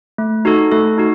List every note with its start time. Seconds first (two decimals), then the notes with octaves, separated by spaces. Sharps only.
0.18 A3
0.45 D#4 F#4 A4
0.72 A3 A4
0.98 D#4 F#4